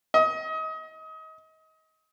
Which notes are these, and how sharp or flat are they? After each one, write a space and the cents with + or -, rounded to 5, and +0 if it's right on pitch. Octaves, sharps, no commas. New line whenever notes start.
D#5 +30